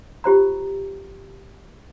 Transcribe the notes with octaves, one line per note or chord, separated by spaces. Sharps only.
F4 G4 C5 A#5